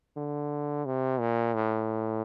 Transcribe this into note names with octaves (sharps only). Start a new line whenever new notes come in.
D3
C3
A#2
A2